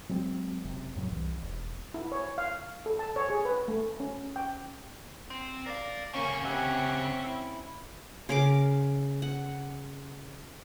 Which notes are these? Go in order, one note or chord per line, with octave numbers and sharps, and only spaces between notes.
F#3 G#3 C4
F#1 C3
F#2 A2 F#3
C2 E3
E1
E4
C#5
F5
A4
A5
C#5
G#4
B4
A3
C#4
G5
C4
A#4 D5 F5
D2 C#3 A#3 C#4 C#6
C4 C#4 G4 E5 F#5 G#5
E4
C#3 A#4 D6
F#5